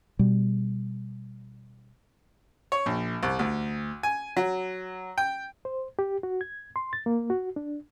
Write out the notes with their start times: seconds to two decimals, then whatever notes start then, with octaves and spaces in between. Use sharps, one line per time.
0.19 B2 G3
2.72 C#5
2.86 A#1
3.23 C2
3.39 D2
4.03 G#5
4.37 F#3
5.18 G5
5.65 C5
5.99 G4
6.23 F#4
6.41 G#6
6.76 C6
6.93 A6
7.06 A#3
7.30 F#4
7.56 D4